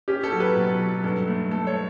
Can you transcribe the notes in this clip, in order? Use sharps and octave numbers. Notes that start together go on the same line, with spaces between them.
C#4 G4
A4
F#3
B4
B2
F#3
G2 A4
A3
A3 A4
C#5